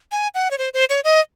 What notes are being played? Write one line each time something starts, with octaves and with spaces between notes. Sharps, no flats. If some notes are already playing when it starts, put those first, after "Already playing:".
G#5
F#5
C#5
C5
C5
C#5
D#5